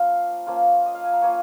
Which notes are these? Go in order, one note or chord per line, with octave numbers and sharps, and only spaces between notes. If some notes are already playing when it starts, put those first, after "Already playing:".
Already playing: F3 A#3 C#4 F4 F5
F3 A#3 C#4 F4
D#5
F5
G#5
A#5
F3 A#3 C#4 F4 G#5 C#6